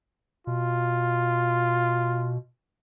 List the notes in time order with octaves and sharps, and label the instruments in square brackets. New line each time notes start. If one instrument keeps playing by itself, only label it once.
[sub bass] B2 [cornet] F4